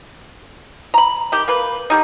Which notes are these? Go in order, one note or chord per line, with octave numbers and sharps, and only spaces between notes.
A#5 B5
D#3 G4
A#3 B4
D3 G3 D#4